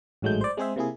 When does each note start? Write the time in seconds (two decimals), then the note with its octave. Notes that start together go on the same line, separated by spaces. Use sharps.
0.22 A1 G#2 F#3 G#3 A3 G6
0.41 C5 D5
0.57 G#3 C4 G#4 C5 E5
0.76 C3 A#3 E4 G#4